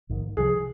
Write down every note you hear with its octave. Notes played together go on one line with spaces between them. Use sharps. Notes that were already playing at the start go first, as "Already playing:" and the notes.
A#1 G#2 D#3
C2 C3 F3 G#4